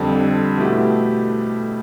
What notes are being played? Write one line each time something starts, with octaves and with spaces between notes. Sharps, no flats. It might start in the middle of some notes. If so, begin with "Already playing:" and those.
Already playing: F2 D3 G3
B2 A3 E4 G4